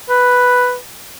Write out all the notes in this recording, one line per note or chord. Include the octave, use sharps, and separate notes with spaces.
B4